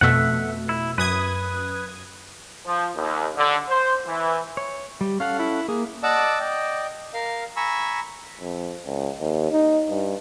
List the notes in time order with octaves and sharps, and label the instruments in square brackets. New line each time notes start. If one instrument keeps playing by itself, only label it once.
[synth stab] F2 B2 A3 [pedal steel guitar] E5 F#5
[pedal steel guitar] E4
[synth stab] F#2 D#6 G#6 [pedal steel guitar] B4
[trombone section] F3
D#2
D3
C5
E3
[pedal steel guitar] C#5
[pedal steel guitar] G3 [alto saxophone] G4
[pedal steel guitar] C#4 A4 F#5 [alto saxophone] F5
[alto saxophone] E4
[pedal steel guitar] A#3 [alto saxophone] G#4
[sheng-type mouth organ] D5 D#5 F#5 A5 D6 E6
D5 D#5 G5
A#4 F5
G#5 A#5 B5 C#6 E6
[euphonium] F2
C#2
D#2
D#4
G2